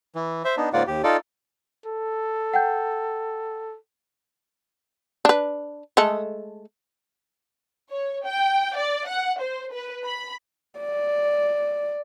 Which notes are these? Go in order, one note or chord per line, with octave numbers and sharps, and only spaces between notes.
E3
C5 E5
B3 D4 D#4
G#2 C#3 A#3 F4 D5 F#5
D#2 G4
D#4 F4 A4 D5
A4
F#5 G5 G6
D4 B4
G#3 A3 A4
C#5
G5
D5
F#5
C5
B4
B5
D5